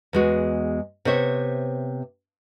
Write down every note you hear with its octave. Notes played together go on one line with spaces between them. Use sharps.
E2 G#3 F#4
C3 B3 C5 C#5 E5